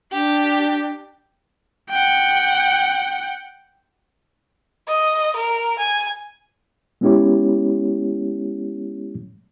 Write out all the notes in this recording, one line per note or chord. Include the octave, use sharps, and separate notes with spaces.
D4 G4
F#5 G5
D#5
A#4
G#5
G#3 B3 C#4 E4 G4 C#5